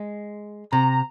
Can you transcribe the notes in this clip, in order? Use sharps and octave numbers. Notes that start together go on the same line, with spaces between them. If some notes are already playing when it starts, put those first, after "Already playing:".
Already playing: G#3
C3 A#5